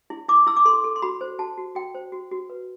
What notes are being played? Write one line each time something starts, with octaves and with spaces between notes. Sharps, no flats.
E4
E4 D6
E4 E6
D6
A4 C6
A4
C6
F#4 B5
C5
F#4 A5
F#4
F#4 G5
C5
F#4
F#4
B4